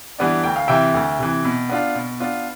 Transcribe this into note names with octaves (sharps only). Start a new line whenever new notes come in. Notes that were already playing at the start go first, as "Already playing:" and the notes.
E3 G3 B3 D4
D2 G5
F5
C3 E3 E5 G5
D2
C3 E3
B2
B3 D4 F4
B2
B3 D4 F4